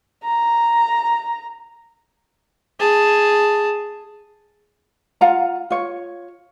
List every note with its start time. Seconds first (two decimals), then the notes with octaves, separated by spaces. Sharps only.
0.24 A#5
2.80 G#4 A5
5.21 F4 F5 F#5 A#5
5.70 F4 C#5